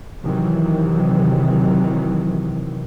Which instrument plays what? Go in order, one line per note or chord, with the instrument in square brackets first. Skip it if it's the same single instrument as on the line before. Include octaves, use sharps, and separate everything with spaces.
[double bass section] C3 D#3 E3 F#3